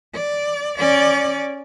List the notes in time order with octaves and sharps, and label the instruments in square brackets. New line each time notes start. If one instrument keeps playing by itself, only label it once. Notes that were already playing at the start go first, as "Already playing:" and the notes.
[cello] D5
C#4 D5